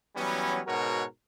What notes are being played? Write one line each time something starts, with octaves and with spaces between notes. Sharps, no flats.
E3 F#3 G3 B3 C#4
G#2 B2 F#4 A#4 C#5 F#5